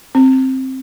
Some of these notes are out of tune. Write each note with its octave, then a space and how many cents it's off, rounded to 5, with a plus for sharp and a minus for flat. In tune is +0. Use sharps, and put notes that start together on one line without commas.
C4 +10